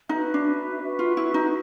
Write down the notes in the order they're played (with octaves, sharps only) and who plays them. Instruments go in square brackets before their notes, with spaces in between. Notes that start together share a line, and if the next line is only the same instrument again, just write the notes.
[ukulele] D#4 [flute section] F#4 B4 E5
[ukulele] D4
[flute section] F#4 B4 E5
[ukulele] F4
E4
D#4